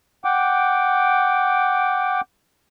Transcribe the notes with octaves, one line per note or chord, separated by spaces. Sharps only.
F#5 G5 D6